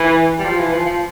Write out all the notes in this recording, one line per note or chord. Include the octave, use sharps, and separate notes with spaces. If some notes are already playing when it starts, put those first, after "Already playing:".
Already playing: E3
G3
F3
E3
F3
F3